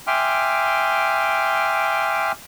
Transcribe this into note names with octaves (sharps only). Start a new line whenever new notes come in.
E5 G5 G#5 C6 D6 F6